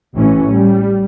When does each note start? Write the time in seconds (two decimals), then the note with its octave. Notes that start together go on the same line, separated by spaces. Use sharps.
0.15 A1 A2 E3 C#4
0.51 G3